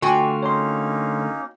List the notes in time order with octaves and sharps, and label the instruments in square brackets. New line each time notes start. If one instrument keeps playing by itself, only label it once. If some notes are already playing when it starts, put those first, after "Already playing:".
[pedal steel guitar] D3 A3 F4 [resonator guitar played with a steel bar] F#4 G5 G#5 [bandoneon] D5
[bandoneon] A#3 C#4 D#4 [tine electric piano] C#5 C6